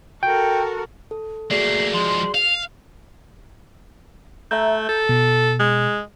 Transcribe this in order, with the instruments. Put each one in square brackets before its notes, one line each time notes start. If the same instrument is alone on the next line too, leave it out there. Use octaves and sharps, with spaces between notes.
[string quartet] F#4 A4 A#4 [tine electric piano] G5
[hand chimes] A4
[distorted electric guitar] A3 A#3 [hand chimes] F#4 G#4 D5 [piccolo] C7
[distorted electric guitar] F3 G#3 [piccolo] C6
[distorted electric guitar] F5 [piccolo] F7
[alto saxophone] A3 [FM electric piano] E5 A#5 G6
[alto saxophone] A4
[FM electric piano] B2
[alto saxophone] G#3